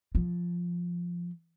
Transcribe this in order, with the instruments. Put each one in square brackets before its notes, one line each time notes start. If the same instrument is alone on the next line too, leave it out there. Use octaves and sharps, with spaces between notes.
[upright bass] F3